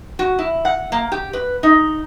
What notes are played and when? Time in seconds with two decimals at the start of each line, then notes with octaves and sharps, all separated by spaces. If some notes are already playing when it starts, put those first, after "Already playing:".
0.19 F#4
0.39 E4
0.65 F#5
0.92 A#3
1.12 G4
1.33 B4
1.63 D#4